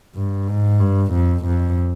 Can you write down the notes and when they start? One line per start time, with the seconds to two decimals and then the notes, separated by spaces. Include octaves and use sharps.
0.15 G2
0.48 G#2
0.80 G2
1.14 F2
1.46 F2